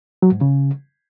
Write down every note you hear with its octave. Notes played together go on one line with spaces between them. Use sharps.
F#3
G#2
C#3